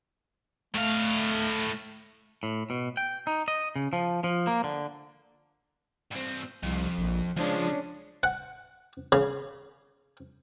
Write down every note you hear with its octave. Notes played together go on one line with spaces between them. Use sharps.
A2 A3 F5
A2
B2
G5
D#4
D#5
C#3
F3
F3
A#3
D3
G2 C4
C2 F2
A#1
C#2 F3 G#3 C#4 D4
F#5
C#3